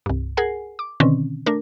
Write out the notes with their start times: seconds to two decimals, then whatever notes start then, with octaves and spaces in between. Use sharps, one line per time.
0.06 C2 G2
0.37 G#4 A#4 F#5 G#5 C7
0.79 D6
1.00 B2 D3 D#3 C4 C#4
1.46 A3 D4 A#4